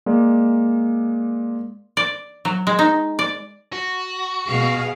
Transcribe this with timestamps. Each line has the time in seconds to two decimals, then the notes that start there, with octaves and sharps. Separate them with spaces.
0.06 G#3 A#3 D5
1.97 D5
2.45 F#3
2.67 G#3
2.79 D#4
3.19 D5
3.73 F#4
4.48 B2 G#4 F5